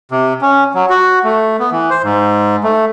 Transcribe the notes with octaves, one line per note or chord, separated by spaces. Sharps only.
C3
C#4
F#3
F#4
A3
B3
E3
C5
G#2
A3